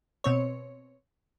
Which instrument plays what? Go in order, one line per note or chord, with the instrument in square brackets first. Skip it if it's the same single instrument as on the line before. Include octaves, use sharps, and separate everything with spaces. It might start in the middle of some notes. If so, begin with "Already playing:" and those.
[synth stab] B2 C4 C#5